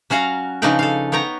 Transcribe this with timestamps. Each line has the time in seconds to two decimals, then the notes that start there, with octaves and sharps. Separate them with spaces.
0.10 F#3 C#4 F#4 F5 A#5
0.62 C#3 F3 D4 D#4 B4 G5
0.79 A4 F5
1.12 B3 C#5 G5 A#5